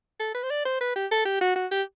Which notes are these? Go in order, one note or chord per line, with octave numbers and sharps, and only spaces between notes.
A4
B4
C5
D5
C5
B4
G4
A4
G4
F#4
F#4
G4